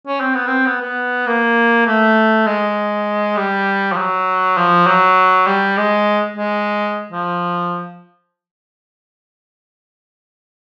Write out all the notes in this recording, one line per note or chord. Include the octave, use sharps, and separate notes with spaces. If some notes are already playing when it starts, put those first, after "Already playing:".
C#4
C4
B3
C4
B3
B3
A#3
A3
G#3
G3
F3
F#3
F3
F#3
G3
G#3
G#3
F3